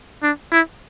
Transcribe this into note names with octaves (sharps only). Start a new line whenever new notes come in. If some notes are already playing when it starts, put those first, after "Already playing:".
D4
E4